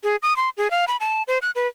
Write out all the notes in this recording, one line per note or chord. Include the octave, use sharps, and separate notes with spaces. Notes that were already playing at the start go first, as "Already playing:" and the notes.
G#4
D#6
C6
G#4
F5
B5
A5
C5
F#6
B4